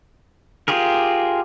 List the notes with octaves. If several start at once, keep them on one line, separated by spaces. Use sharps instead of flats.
F4 G4 G#4 A#4